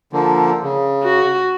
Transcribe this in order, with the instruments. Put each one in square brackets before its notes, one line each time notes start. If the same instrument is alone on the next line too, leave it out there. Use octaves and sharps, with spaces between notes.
[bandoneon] D3 F3 A#3
C#3
[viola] F#4